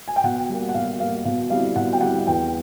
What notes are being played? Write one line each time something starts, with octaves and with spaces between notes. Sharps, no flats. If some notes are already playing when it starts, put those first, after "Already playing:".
G#5
G5
B2 F#5
G3 A#3
F#5
B2 F5
G3 A#3 F5
B2 F5
G3 C4 E4 F5
B2 F#5
G5
G3 C4 E4 F#5
E2 G5